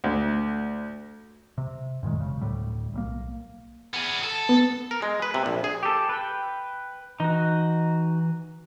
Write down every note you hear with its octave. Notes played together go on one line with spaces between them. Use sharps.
D2
C3
F#2 A#2 D#3 G#3
E1 C#3
D2 A2 G3
B1 G3 A#3
B3 G#4
A4
B3
A#4
G#3
B4
C3
A#1
G#4
G4 A4
B4 G5
E3 D#4 F#4